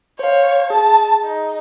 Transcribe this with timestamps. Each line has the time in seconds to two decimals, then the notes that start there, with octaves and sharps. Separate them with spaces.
0.19 C5 C#5 F5
0.70 G#4 A5
1.22 D#4